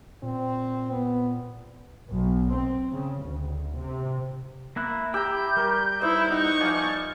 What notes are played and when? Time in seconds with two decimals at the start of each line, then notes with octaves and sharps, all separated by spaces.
0.23 A#2 C4
0.92 B3
2.11 B1
2.53 C4
2.92 C#3
3.24 D2
3.76 C3
4.76 A#3 E4 F#6
5.14 E4 G4 G5 A#5 E6 G6
5.56 G3 A#4 C#6
6.01 D#4 E4 B4 C5
6.32 D#4 F#5 C#6
6.61 F3 D5 E5 F5 G#5